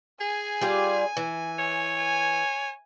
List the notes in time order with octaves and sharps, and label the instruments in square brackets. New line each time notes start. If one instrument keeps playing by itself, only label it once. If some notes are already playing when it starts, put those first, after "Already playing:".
[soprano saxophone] G#4 [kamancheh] G#5
[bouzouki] G3 F4 G4
E3
[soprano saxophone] C#5
[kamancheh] G#5